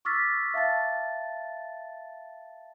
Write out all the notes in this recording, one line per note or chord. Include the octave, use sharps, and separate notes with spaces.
C#6 D6 E6 F6 A6 B6
E5 F5 A5 A6